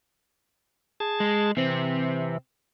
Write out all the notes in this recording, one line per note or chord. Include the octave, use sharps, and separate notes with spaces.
G#4 A5
G#3
C3 E3 C4